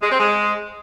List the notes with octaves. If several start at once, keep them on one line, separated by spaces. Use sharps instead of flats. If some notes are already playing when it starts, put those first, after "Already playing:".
G#3
C4
G#3